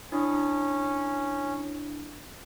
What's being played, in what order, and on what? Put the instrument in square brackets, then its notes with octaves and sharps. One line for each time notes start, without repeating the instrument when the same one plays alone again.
[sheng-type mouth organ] C#4 [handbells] D4 E4 D#6